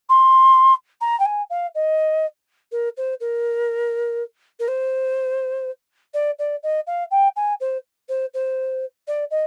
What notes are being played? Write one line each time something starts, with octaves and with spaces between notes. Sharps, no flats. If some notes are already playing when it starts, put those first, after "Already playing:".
C6
A#5
G5
G#5
F5
D#5
A#4
C5
A#4
A#4
C5
D5
D5
D#5
F5
G5
G#5
C5
C5
C5
D5
D#5